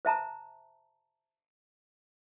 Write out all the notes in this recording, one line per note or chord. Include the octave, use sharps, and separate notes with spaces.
C5 E5 A5 A#5